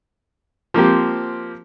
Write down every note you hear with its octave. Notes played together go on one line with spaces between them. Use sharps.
F3 A#3 C4 G4